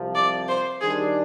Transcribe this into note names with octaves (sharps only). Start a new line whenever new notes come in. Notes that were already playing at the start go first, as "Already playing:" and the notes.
Already playing: C2 C3 F3
D5
C5
D#3 G3 D4 G#4